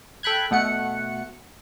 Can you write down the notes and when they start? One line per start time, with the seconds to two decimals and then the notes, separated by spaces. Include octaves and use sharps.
0.23 A4 G5 B5 F#6 G#6
0.51 B2 A3 F#5 C#7